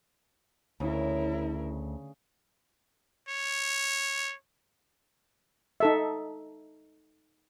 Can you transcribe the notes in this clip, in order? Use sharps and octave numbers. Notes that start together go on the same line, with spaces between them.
D2 C#3 E4 A#4
C#5
D#4 A4 E5